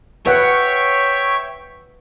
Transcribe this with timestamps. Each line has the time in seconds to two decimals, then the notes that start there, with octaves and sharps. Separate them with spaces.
0.26 B4 C#5 E5 F#5 G5